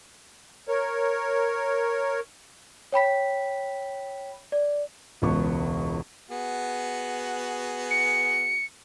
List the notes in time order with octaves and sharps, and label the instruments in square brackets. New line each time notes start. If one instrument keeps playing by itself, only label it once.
[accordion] A#4 C#5
[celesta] C#5 G5 B5 B6
D5
[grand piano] E1 C#2 B3 C#6
[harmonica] B3 F#4 G#4
[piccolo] C#7